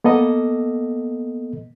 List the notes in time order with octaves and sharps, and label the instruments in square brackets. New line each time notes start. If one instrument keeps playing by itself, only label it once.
[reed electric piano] A#3 B3 A4 D#5